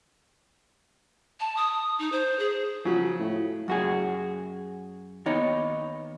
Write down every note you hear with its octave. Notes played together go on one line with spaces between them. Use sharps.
A5
D#6
D#4
C5
G#4
C#3 F3 F#3
A2
F#2 F#4 G#4
D#2 B3 D#4 C#5